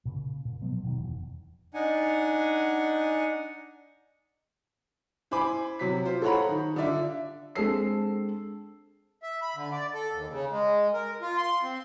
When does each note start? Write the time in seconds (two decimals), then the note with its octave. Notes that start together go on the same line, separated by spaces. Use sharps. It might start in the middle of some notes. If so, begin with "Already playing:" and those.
0.05 A#2 C#3
0.45 A#2
0.61 B2 F3 F#3 B3
0.83 E1 B2 D#3 F#3
0.99 F1 E2
1.74 D4 D#4 F#5 G#5
5.31 E4 C5 G#5 B5 D6
5.79 C3 F#3 B6
6.05 F4 C5
6.22 A4 C5 C#5 F#5 A#5 B5
6.48 D#3
6.76 D3 F4 D5 E5
7.55 G#3 C4 D4 A4 E6 C7
9.23 E5
9.42 B5
9.56 D3
9.72 D5
9.94 A4
10.13 D#2
10.30 C#3
10.51 G#3
10.93 A#4
11.21 F4
11.37 C6
11.63 C4